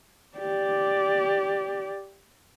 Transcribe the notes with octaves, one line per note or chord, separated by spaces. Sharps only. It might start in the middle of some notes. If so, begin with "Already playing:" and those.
G4 D5